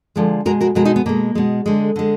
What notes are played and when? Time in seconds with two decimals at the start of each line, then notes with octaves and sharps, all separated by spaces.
0.16 D3 F3 G#3
0.46 B2 G#3 F#4 A#4
0.61 F#4 A#4
0.75 B2 G#3 F#4 A#4
0.85 D#4 F#4
0.96 B3
1.06 B2 G#3 A#3
1.35 B2 G#3
1.66 D3 G#3
1.96 D3 G#3